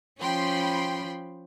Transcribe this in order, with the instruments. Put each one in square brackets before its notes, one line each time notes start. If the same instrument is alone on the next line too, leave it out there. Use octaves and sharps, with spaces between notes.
[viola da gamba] F3 C#4 [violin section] G5 B5 C6